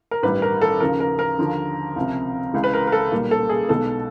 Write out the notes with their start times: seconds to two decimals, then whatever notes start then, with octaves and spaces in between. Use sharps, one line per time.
0.11 A#4
0.23 A1 G2 D#3 G3 B4
0.42 A#4
0.62 A4
0.80 D#2 C#3 F3 A#4
1.00 A#4
1.19 A#4
1.38 D#2 D3 F3
1.96 C#2 C3 F3
2.54 C#2 C#3 E3 G#3
2.64 B4
2.74 A#4
2.87 A#4
2.92 A4
3.11 B1 A#2 G3 A#3
3.31 A4
3.49 G#4
3.69 B1 B2 G#3 A4